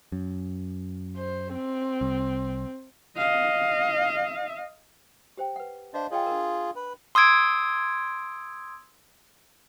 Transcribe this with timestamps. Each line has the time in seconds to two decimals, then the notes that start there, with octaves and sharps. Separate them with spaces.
0.12 F#2
1.16 C5
1.55 C4
2.01 C2
3.17 D#5 F5
5.37 G4 C5 G5
5.56 B4 F#5
5.94 D4 C5 D#5 F5
6.11 F4 G#4 C#5 D#5 G5
6.26 D4 A#4
6.76 B4
7.15 C6 D#6 E6 G#6 D7